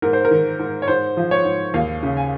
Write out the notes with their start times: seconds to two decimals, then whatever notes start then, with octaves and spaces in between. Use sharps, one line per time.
0.02 G#2 A#4
0.13 C5
0.25 A#4
0.31 D#3
0.59 G#2
0.82 C#5
0.88 G#2 C5
1.17 F3
1.31 C#5
1.45 G#2
1.74 D#2 F5
2.03 C#3
2.17 G#5